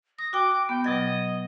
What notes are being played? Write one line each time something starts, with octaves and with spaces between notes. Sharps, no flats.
D#6 A#6
F#4 G5 D6
B3 G5
B2 F#3 D#5 G#6